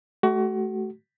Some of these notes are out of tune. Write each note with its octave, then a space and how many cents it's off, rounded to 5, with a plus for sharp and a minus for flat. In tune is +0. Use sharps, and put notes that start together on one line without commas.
A3 -30 F#4 +30